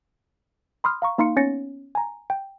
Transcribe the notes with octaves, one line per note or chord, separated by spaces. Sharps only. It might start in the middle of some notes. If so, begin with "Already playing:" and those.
B5 C6 D#6 F6
F5 A#5 C#6
A#3 D#4 F5 C6 C#7
B3 C#4 C#5 A6 A#6 C#7
G#5 A#5
G5